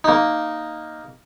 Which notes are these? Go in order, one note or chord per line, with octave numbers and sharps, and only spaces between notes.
A#3 D#4